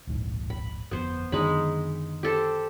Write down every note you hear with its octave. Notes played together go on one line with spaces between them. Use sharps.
D1 A#1 G#2
B5
G1 F2 B3 C5
F#2 D3 D#3 G#3 D#4 B5
G4 A4 C5